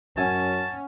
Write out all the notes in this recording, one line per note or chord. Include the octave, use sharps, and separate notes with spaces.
F#2 C#4 F#5 G#5 A5 E6